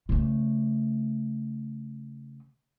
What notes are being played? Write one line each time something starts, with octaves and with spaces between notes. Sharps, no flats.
C#3 A3